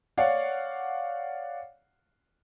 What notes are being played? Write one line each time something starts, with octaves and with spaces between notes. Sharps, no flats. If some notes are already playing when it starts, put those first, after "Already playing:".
C#5 D5 F5 F#5